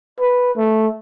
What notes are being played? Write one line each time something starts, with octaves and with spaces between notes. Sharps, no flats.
B4
A3